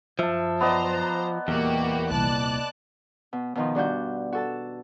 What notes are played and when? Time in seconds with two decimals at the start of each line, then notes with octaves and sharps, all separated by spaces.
0.19 F#2 F3 E5 A5
0.60 B3 C5 D5 D#5 A#5
1.48 D#1 E2 A#3 F#4 G4
2.10 D#1 C2 D5 A5 F#6
3.33 B2
3.55 B2 D#3 F3
3.75 G2 D4 F#4 G6
4.33 F#4 A4 A5